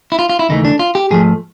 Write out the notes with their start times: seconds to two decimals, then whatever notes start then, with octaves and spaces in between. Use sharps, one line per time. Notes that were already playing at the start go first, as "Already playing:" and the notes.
0.12 E4
0.19 F4
0.29 F4
0.39 E4
0.49 D#2 C#3 E3 A3 D#4
0.65 D4
0.79 F4
0.95 G4
1.11 G#2 F3 A3 G#4